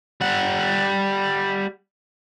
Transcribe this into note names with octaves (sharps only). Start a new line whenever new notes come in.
G3 F#5